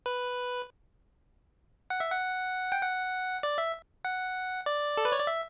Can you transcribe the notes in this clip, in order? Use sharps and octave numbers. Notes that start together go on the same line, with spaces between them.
B4
F#5
E5
F#5
G5
F#5
D5
E5
F#5
D5
A4
B4
C#5
D5
E5